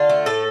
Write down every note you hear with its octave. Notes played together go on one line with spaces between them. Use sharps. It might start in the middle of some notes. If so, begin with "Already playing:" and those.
Already playing: D3 F4
A3
A2 A4